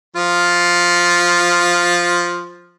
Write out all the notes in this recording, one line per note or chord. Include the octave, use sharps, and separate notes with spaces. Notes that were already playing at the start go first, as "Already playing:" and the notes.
F3 F4